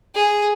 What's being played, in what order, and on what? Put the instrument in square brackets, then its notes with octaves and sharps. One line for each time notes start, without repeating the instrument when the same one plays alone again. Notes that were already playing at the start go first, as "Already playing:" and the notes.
[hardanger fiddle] G#4